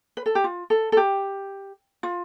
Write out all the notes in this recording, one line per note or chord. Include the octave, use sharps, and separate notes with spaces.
B4
A4
G4
F4
A4
A4
G4
F4